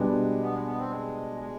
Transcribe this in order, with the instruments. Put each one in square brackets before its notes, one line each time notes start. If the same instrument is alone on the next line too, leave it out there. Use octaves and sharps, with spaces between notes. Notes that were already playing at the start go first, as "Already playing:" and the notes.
Already playing: [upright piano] B2 G3 D4 G4 B4 [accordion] G#3
[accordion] B3
G#3
B3
C4
G#3
G#3